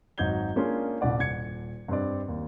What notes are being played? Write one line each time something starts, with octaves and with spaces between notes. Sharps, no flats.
G#1 F#3 D#4 G6 G#6 G7
G#3 A#3 C#4 D4 F4 G#4
D#1 C2 D5 F#5
D#1 G#6 C#7
G2 C4 D5
D#2